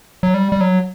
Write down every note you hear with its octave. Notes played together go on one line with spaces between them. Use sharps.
F#3
G3
G3
F#3